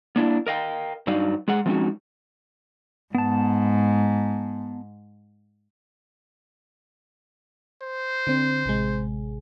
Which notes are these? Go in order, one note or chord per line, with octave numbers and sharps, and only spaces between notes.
A#3 D4 E4
A#4 D#5 F5 G5
G2 F#3 D#4 D5 F5
G#3 G#4 F#5
F3 G#3 C4 C#4 D#4 F#4
G#2 B3 A5
C5
D3 C4
A1 C3 G#3